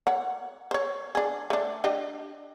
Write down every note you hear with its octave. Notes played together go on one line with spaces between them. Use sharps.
C#5 F#5
C5 C#5
D4 G#4
A3 D4
D4 G4 D#5